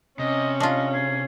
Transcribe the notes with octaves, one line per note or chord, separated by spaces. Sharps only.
C3 C#4 D#5
D4 F4 D#5
G#4